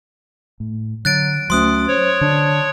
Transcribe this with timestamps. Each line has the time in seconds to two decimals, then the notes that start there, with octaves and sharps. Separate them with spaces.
0.60 A2
1.05 D3 F#3 F#6 A6 D7
1.50 D2 F#3 C#4 C6 D#6 F#6
1.88 C5 C#5
2.21 D3 D4